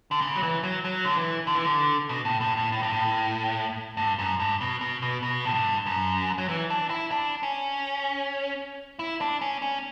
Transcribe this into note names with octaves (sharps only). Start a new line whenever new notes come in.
D3
C#3
F#3
E3
F#3
F#3
D3
E3
D3
E3
D3
B2
A2
A2
A2
A2
G2
A2
G2
F#2
G2
B2
B2
B2
B2
A2
G2
F#2
F#3
E3
D4
E4
D4
C#4
E4
D4
C#4
C#4